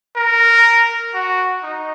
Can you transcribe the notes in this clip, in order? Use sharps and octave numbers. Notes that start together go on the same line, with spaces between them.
A#4
F#4
D#4